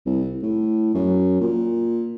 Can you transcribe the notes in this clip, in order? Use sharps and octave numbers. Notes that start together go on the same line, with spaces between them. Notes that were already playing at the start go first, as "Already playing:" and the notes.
C2
A2
F#2
A#2